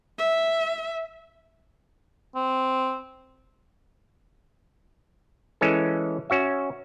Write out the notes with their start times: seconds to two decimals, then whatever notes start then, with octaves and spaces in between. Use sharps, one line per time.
0.18 E5
2.36 C4
5.61 E3 G#3 C#4 A4
6.30 C#4 F#4 E5